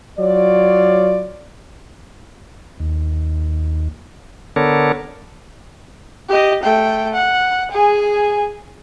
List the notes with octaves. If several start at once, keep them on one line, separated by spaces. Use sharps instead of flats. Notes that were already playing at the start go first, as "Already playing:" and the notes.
F#3 F4 C#5 D5
D#2
D3 B3 D4 A4 A#4 C#5
G4 D#5
A3 G5
F#5
G#4 G#5